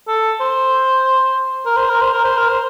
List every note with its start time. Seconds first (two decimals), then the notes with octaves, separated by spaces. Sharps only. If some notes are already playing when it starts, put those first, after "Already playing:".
0.08 A4
0.40 C5
1.65 A#4
1.77 C5
1.89 A#4
2.01 C5
2.13 A#4
2.24 C5
2.37 A#4
2.48 C5